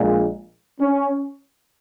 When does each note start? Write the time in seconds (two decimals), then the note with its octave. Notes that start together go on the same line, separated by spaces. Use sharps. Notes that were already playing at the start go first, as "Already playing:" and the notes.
Already playing: A#1 A#2 G#3
0.81 C#4